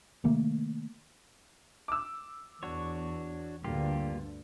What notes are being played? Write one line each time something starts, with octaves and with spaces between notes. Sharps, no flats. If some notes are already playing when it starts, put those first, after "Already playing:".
C3 D#3 A3 A#3
D6 E6
E2 D4 F#4 C#5
D2 G2 D3 A#3 F4 G4